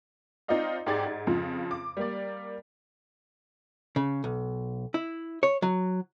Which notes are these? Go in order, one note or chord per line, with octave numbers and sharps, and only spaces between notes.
C4 D#4 F4 D5 D#5 F5
G#2 G4 G#4 D5 G#6 A6
G#2
F2 C#3 F3
D6
G3 A#3 D5
C#3
B1
E4
C#5
F#3